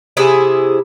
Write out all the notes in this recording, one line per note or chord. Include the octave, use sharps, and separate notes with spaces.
C3 E4 G#4